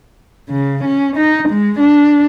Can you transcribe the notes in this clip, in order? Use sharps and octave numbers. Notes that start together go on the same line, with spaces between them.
C#3
C#4
D#4
G#3
D4